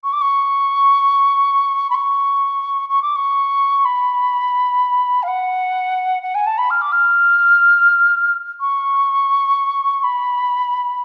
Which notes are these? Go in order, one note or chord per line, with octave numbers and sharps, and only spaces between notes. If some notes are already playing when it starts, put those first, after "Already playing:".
C#6
D6
C#6
B5
C#6
C#6
D6
C#6
B5
F5
F#5
F#5
G#5
A5
B5
F6
D6
F6
C#6
B5